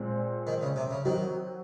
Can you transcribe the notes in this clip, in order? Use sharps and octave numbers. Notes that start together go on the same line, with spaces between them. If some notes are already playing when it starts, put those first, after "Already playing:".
Already playing: A#2 G#3 C4
D#3
C#3
C3
C#3
D#3 F#3 C4 F#4